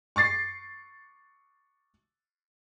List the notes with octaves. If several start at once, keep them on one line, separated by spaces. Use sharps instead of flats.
C#6 D6 A6 C7